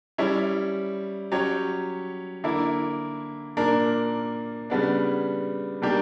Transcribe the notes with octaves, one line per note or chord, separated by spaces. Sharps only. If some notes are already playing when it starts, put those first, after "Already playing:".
G3 C#4 E4
F#3 C#4 G4 C#5
D3 A#3 E4
A#2 A#3 D4 A#4
C#3 G3 B3 D4
B2 G3 A#3 D4 G4